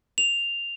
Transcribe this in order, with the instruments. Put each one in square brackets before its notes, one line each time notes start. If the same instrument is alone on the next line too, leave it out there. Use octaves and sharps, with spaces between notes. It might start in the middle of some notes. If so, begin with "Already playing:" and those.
[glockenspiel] F7